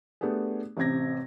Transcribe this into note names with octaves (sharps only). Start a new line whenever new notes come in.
A3 B3 D4 G4 G#4
A1 C3 C4 G#6 A#6